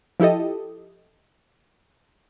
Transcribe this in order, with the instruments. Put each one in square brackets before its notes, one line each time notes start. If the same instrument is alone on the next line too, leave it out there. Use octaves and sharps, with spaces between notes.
[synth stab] F3 E4 G4 A4 D#5